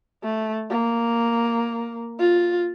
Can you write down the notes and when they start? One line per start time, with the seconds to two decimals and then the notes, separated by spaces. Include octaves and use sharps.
0.23 A3
0.71 A#3
2.20 F4